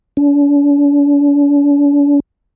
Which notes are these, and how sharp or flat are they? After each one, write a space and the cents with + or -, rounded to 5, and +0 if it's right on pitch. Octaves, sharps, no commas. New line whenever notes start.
D4 -45